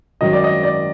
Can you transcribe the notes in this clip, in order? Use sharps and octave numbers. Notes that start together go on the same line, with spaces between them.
G#1 F#2 D#3 F#3 D#5
D5
D#5
D5